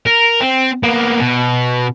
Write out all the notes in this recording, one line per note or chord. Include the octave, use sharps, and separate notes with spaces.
A#4
C4
A#3 B3
B2